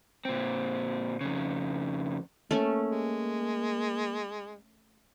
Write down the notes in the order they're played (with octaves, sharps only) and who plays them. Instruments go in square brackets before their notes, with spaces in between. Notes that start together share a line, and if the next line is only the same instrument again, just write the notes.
[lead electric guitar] A#2 C4
F2 C#3
[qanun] A3 C#4 [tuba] A#3
[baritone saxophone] G#3